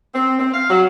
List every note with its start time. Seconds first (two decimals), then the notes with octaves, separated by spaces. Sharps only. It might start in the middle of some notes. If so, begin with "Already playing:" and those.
0.15 C4
0.39 C4
0.54 F5
0.69 F#3